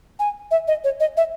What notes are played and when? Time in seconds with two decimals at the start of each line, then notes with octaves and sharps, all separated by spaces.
0.19 G#5
0.51 E5
0.67 D#5
0.84 C#5
1.00 D#5
1.17 E5